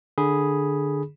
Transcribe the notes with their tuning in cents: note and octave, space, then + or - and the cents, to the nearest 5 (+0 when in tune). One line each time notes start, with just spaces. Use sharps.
D3 +15 G#4 +0 B5 -10